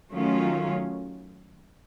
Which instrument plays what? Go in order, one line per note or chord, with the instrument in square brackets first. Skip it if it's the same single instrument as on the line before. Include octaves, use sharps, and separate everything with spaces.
[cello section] D#3 F#3 A3 C#4 F4